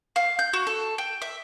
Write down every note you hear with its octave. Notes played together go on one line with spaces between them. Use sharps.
F5
G6
F#4
A4
G5
E5